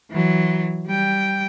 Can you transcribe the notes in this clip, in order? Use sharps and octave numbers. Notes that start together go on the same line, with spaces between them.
E3 F#3
G3 G5